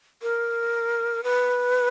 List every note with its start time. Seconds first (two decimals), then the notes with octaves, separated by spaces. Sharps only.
0.22 A#4
1.23 B4